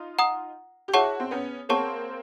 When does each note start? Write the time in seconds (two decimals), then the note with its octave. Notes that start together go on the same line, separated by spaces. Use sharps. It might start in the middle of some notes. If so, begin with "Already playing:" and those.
Already playing: D#4 F4
0.19 F#5 A#5 D#6
0.88 G4
0.94 E4 F#4 G#4 C#5 F#5 A5 C#6
1.20 C4
1.31 B3 C#4
1.69 A#3 C4 G#4 C#5 F#5 A5 C#6